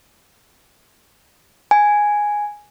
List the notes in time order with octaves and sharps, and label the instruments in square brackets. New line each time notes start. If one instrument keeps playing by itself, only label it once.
[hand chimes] G#5